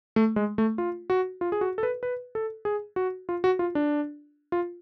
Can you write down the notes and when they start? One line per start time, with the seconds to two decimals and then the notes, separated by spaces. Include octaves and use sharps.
0.16 A3
0.36 G#3
0.58 A3
0.78 F4
1.10 F#4
1.41 F4
1.52 G#4
1.61 F#4
1.78 A4
1.83 B4
2.03 B4
2.35 A4
2.65 G#4
2.96 F#4
3.29 F4
3.44 F#4
3.59 F4
3.75 D4
4.52 F4